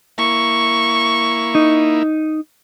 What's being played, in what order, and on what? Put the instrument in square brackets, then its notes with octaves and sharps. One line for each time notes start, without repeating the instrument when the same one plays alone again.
[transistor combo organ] A#3 E4 [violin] C#6
[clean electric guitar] D#4